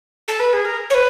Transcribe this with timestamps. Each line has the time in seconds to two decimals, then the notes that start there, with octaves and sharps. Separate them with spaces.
0.27 A4
0.39 B4
0.53 G#4
0.64 A#4
0.89 C#5
0.94 B4